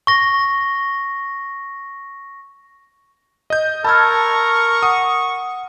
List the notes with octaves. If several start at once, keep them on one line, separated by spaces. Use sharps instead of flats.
C#6 A#6
D#5 G6
A#4 A5 B5 C#6 E6 F6 G#6
F#5 D#6